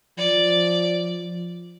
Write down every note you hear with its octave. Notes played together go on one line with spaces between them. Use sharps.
F3 D5